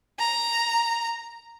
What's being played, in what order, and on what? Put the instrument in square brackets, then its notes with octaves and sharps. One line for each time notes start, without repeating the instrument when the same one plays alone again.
[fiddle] A#5